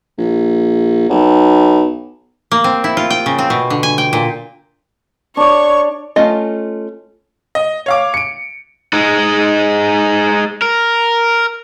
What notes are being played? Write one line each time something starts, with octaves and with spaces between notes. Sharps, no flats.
A#1
B1
A#3
C4
E4
F4
G5
C#3
C4
B2
D3
G#5
G5
A#2
D4 C#5 D5 C#6
A3 C#4 F4 D#5
D#5
C#5 F5 D6
C#7 D7
G#3 D#4
A#4